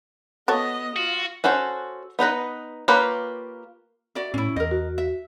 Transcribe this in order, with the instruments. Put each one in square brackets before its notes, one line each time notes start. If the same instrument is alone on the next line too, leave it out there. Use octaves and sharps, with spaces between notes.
[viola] B3 D#5 [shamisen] F#4 A4 C#5
[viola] F4 [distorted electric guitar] F#4
[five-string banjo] C#4 F#4 A4 C5
B3 D#4 B4 D#5
A#3 F4 G4 B4 C#5
[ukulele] F#4 D5 E5
[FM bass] A2 [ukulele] C#4 E4
[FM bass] E2 [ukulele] A#4 D#5
[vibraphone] F#4
[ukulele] E5